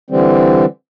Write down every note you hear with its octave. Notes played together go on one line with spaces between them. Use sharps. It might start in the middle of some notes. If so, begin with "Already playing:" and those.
D3 E3 G3 C4